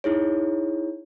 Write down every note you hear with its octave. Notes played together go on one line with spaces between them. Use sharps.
D#4 E4 G#4 C#5